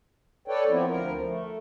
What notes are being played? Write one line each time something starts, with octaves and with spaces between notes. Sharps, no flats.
A4 B4 C#5 D5 G5
F3 B3 C4 E4
D2 F3 A#4
A3